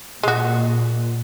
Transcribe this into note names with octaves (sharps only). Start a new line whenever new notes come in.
A#2 G#3 F#4